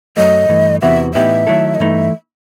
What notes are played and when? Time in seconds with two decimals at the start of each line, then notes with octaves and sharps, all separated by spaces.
0.17 F#2 F#3 A3 D#5
0.49 G2 E3 A3
0.82 E2 C3 E3 B3 F#4 E5
1.14 A2 E3 B3 D#4 G4 E5
1.47 D#3 F#3 A3 E4 A4
1.75 D#5
1.80 G2 E3 A3 D#4 E5